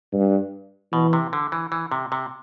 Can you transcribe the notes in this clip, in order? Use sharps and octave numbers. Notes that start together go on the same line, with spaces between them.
G2
B2 E3
C3
D3
E3
E3
C3
C3